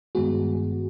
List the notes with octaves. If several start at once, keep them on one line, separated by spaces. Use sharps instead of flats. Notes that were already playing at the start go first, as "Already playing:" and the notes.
G2 D#3 G#3 B3 F#4 G#4